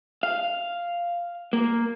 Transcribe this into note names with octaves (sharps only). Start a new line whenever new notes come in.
F5
A#3